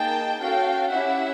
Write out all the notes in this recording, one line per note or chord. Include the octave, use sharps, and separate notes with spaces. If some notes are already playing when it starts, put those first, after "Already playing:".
Already playing: A#3 D#4 G#4 G5 A5
C#4 F#4 A4 F5 G5
C#4 E4 G4 E5 F#5